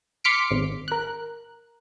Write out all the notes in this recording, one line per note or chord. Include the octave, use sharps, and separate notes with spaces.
C6 D6 F6 B6 C#7 D7
G#1
A#4 F#6